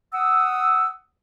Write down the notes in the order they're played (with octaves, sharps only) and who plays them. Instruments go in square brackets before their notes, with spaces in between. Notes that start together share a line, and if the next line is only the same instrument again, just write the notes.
[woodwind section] F#5 D#6 E6